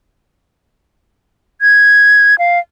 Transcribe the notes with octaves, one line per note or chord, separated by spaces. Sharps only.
G#6
F5